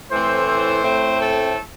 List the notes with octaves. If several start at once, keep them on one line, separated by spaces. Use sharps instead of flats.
A2 E3 A3 C4 C5
C5
A2 A3 C4
A4